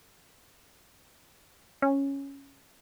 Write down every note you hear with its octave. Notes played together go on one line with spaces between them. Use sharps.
C#4